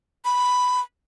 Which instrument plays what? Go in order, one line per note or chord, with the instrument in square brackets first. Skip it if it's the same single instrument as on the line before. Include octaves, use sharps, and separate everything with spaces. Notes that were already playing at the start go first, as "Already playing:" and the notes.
[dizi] B5